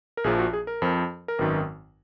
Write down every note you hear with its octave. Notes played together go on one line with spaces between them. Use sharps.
A#4
A#1 A#2 F3 G#4
F#4
G#4
A#4
F2 F3
A#4
G#1 F#2 D#3 B4